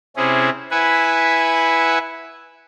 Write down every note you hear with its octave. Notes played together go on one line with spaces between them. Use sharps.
C3 C4 C#4 E4 G#4
E4 B4 E5 F#5 G#5